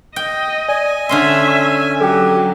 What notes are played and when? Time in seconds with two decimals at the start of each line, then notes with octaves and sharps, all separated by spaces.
0.16 D#5 G5
0.69 D5 G#5
1.09 D3 C#4 E5 C6
1.47 C#6
2.00 F#3 G4 A4 G5